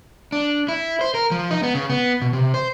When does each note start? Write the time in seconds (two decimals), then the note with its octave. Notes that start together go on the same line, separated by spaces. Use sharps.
0.32 D4
0.68 E4
1.01 C5
1.14 A#4
1.31 F3
1.51 D#4
1.63 B3
1.75 C#3
1.90 B3
2.22 B2
2.33 C3
2.54 C5